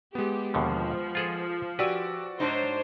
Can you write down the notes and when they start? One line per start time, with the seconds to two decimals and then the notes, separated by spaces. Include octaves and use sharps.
0.15 G#3 B3 G4
0.54 D#2 B2 D3 F3
1.15 F4 G#4 A4
1.79 F#4 G4 B4 D5 G#5 E6
2.40 G#2 D4 D#4 C5 C#5